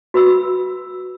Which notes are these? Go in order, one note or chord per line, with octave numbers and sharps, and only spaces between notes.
F#4 B4 B5 E6